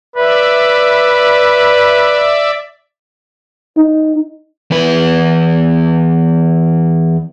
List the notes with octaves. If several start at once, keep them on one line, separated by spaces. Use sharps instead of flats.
B4 D5 E5
D#4
E2 B4